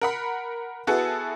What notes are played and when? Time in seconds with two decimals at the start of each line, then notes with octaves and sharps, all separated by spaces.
0.01 A#4 F#5 B5
0.87 B3 E4 F#4 G#4 A4 B4